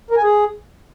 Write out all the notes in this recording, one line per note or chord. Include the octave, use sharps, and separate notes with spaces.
A#4
G#5
G#4